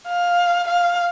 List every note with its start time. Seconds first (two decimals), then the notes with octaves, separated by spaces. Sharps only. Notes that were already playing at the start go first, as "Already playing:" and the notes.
0.08 F5
0.68 F5